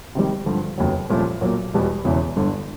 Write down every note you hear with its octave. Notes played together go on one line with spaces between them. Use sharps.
C3 D#3 G3
G2 D3 F3
F1 D#2 C#3 F#3
C2 A#2 F3 A3 C#4
B1 A#2 F#3 A#3
E1 E2 B2 G3
E1 E2 C#3 E3
G1 G2 D3